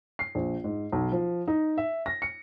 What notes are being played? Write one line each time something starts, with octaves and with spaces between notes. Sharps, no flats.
C7
A#1
G#2
B1
F3
D#4
E5
A#6
C#7